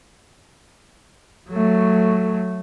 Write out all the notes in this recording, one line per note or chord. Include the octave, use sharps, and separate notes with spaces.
F#3 A3